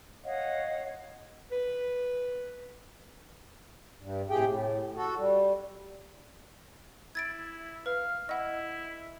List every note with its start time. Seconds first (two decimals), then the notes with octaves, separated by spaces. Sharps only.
0.24 C#5 D#5 F5 F#5
1.52 B4
4.00 G2
4.30 A2 C3 G4 G#4 G5
4.46 A2
4.96 F#4 A4
5.18 G3
7.15 E4 G#6 A6 D7
7.86 B4 F5
8.29 E4 D#5 F#5